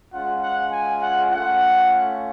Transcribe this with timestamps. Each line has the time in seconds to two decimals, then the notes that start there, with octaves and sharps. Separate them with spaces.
0.13 G#3 C#4 F4 F#5
0.42 F#5
0.72 G#5
1.02 F#5
1.32 A3 C#4 F4 F#5